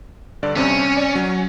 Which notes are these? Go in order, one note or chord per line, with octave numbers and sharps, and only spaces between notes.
G2 D3 D5
G2 C3 C4 C#4
D5
F#3 C#4